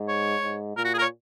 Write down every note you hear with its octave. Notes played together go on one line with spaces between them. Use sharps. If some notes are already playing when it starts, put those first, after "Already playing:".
Already playing: G#2
C#5
G#2
A#2 A#4
F#4
G#4
A#4
C#5